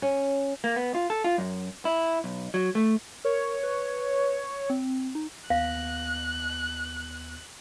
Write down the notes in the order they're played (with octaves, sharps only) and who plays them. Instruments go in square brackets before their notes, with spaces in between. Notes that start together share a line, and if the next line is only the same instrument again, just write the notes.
[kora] C#4
[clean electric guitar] A#3
B3
F4
A4
F4
F#2
E4
B1
F#3
A3
[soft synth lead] A#4 [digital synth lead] C#5
[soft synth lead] B4
C4
D#4
[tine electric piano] D#2 B3 A#6 [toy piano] F5 [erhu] F#6